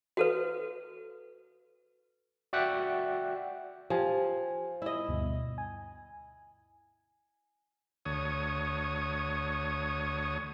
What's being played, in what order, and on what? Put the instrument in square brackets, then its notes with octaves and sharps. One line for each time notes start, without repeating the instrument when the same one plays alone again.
[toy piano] F#4 A4 B4
[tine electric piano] F#4 D5 E5 F#5 G5 F#6
[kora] F3 [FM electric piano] G4 G#5
[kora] E4 D#5
[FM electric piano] D2 G2 B2
G#5
[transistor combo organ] D2 C#5 D#6